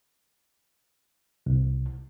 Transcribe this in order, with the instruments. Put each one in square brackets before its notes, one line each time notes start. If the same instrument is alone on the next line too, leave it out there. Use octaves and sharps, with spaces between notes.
[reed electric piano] C2